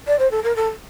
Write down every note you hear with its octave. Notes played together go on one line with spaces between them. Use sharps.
D5
C5
A4
A#4
A4